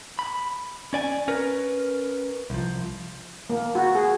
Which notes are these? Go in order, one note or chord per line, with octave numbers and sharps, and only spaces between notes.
B5
C#4 D5 G#5
C#4 A#4 B4
C2 F3
A#3
F#4
G#4